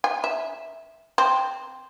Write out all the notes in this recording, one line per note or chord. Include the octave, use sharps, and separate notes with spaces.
G#5
E5
C4